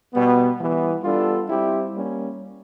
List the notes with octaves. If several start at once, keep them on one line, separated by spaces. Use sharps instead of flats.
B2 G3 B3
E3 G3 B3
G3 B3 D4 F4 A4
G3 C4 E4 G4
G3 A#3 C#4